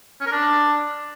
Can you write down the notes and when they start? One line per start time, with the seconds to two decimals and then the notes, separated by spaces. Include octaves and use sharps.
0.21 C#4
0.26 A#4
0.32 D4